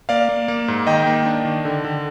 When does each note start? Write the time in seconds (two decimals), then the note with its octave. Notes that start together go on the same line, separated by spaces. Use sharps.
0.09 A#3 D5 F5
0.29 A#3
0.48 A#3
0.68 G#2
0.87 D#3 D#5 G5
1.07 A#3
1.26 D4
1.45 D#3
1.65 D3
1.84 D3